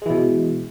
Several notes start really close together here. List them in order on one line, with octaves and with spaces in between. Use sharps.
G#3 E3 B2